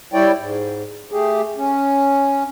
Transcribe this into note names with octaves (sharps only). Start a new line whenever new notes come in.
G3 E4 C#5 D5 G5
G#2
A3 G4 G#4
C#4